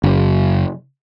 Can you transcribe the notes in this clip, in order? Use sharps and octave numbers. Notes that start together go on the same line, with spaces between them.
F#1